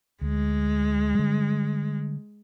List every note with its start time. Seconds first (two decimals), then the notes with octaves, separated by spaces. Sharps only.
0.21 D2 G#3
1.15 D3 G3